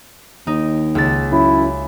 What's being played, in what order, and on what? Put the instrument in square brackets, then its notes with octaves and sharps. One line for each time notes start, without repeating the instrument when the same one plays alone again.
[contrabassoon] D#2 [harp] D#4
[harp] C#2 E6 A6
[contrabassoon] F#2 [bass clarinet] E4